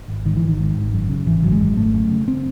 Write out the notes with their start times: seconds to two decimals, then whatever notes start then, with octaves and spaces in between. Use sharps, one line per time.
0.08 G#1
0.25 G#2 D#3
0.37 E3
0.42 G#1
0.48 D#3
0.59 G#2
0.76 G#1
0.92 F#2
1.09 C#3
1.26 G#1 E3
1.43 G#1 F#3
1.52 G#3
1.60 F#2
1.77 G#1 A3
1.94 F#2
2.11 C#3
2.28 C4